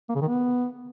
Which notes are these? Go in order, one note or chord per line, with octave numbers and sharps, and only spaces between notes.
A#3
C#3
D#3
B3